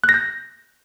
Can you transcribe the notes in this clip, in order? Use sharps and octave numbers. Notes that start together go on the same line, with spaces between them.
F#6
A#6
G6